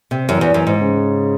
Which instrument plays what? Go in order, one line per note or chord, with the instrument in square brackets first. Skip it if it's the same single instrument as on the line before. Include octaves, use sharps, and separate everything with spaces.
[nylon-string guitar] C3
[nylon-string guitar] F#2 [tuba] E3
[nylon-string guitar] E2
F#2
G#2
[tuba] C#3